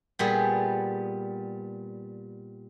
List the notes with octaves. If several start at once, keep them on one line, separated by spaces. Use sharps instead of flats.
A#2 G3 B3 G#4